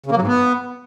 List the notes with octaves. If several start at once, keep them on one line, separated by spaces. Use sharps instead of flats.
C#3
A#3
F#3
G#2
B3